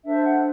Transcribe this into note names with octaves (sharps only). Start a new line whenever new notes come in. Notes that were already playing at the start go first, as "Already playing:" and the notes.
D4 A4 C5 E5
F#5